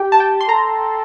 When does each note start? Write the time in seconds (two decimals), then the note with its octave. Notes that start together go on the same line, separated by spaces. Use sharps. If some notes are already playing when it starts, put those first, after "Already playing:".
Already playing: G4 G5
0.12 A5
0.20 G5
0.41 C6
0.49 A4 A#5